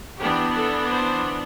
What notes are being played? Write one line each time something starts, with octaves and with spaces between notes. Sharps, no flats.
E3 B3 D4 G4
A4
C5